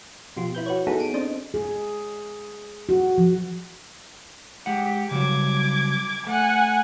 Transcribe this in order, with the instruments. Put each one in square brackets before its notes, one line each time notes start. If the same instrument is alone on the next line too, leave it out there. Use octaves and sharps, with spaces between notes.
[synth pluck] B2 F3 F4 G4
E4 B4 G6
F#4 B4 C#5
B3 D#4 E4 F#4 G#4 A4
D7 D#7
C4 D4 C5 D#5
[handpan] G#4
F#4
F3
[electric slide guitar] G#3 F#5 [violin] G4
[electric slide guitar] C#3 F#3 G3 [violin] D6 G#6
[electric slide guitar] A3 [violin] F#5 G#5